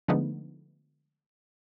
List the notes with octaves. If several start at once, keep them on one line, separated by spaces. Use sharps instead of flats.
D3 F3 G#3 A3 B3 D#4